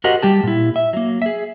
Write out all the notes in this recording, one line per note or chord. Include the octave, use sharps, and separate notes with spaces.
F#4 G4 A#4 C5 D#5 F#5
G3 G4 A5
A#2 E4
E5
F#3 A#3
G#4 E5